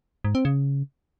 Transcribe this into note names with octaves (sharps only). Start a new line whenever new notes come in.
G#2
C4
C#3